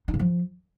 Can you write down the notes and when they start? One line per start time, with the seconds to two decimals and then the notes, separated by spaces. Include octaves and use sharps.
0.08 D#4
0.14 C#3
0.19 F3